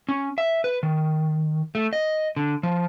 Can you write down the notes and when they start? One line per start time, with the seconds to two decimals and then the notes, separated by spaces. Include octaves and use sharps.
0.09 C#4
0.38 E5
0.64 B4
0.83 D#3
1.75 A3
1.93 D#5
2.37 D3
2.63 F3